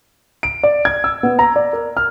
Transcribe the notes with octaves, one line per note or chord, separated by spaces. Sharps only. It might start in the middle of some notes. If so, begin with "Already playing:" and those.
D7
D5
G#6
E6
B3
A#5
D5
A#4
F6